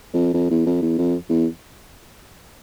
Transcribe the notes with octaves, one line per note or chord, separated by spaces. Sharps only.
F2
F2
E2
F2
E2
F2
E2